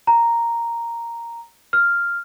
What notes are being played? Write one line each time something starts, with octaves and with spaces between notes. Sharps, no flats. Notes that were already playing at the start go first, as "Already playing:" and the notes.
A#5
F6